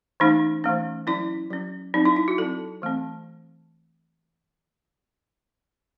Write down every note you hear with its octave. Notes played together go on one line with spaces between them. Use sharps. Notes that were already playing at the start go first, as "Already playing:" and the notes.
E3 A3 C#4 D#4
E3 A3 C#4
F#3 C#4 E4
F#3 C#4
F#3 C4 D#4
E4
E4
F#4
F#3 C4 A4
E3 A3 C4